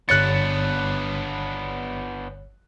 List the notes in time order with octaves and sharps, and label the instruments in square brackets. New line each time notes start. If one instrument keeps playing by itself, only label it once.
[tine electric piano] G1 C#5 A6 [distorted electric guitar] B3 D4 [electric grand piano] F#6 C#7